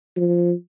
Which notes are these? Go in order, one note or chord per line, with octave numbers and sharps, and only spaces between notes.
F3